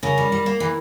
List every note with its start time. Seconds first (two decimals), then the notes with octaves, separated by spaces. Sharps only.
0.03 C#3 A#4
0.18 G3
0.32 G3
0.46 A#3
0.60 E3